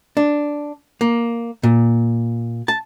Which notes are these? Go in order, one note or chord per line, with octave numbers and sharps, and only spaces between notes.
D4
A#3
A#2
A5